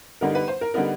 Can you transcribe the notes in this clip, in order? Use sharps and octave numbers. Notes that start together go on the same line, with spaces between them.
D3 G3 B3 D#4 A#4
B4
C5
A#4
D3 G3 B3 D#4 A#4